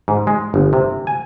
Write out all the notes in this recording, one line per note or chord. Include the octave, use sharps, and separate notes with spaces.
G#2
G#3
G1
C3
G#5